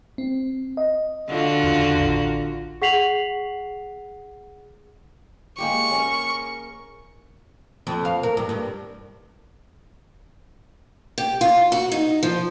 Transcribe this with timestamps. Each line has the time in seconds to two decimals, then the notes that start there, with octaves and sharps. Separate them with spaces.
0.18 C4
0.77 D#5
1.29 D3 F4 F#4
1.64 E2 C#3
1.98 A1
2.82 G#4 F#5 B6 C7 F7 F#7
5.58 G#3 A#3 G4 C#6
5.91 C#4 G#4 A#4
7.87 F2
8.05 F5
8.23 A#4
8.37 G2
8.49 G2
11.18 G4
11.41 F4
11.72 F#4
11.92 D#4
12.23 F3